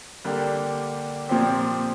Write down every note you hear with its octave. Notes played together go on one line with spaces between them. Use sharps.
D3 G3 A#3 D4 G4
A#2 F3 C4 G4